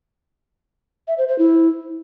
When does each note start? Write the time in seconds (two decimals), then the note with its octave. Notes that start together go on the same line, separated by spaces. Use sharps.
1.08 E5
1.18 C5
1.28 C5
1.39 E4